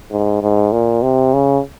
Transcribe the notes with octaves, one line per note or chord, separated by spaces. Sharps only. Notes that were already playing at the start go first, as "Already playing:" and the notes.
G#2
G#2
A#2
C3
C#3